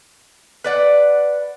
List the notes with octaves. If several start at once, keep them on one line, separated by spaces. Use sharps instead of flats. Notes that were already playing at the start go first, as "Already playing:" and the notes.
B4 D5 F#5